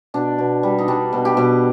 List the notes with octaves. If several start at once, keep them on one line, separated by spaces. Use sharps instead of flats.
B2 D4
B2
G3
D#4
G3 D4
B2
G4
B2